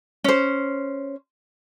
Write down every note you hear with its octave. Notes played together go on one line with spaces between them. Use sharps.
C#4 C5